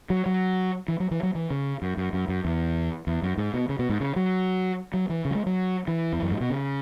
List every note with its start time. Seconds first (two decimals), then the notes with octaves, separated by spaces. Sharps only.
0.10 F#3
0.26 F#3
0.88 E3
1.00 F#3
1.11 E3
1.23 F#3
1.35 E3
1.50 C#3
1.82 F#2
1.97 F#2
2.13 F#2
2.28 F#2
2.45 E2
3.07 E2
3.22 F#2
3.38 G#2
3.54 B2
3.69 C#3
3.79 B2
3.89 G#2
4.00 C#3
4.16 F#3
4.94 F#3
5.09 E3
5.25 C#3
5.31 F#3
5.35 G#3
5.46 F#3
5.88 E3
6.13 E2
6.22 F#2
6.31 G#2
6.41 B2
6.50 C#3